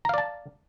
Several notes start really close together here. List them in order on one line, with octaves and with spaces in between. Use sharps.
A#5 F5 D5 A5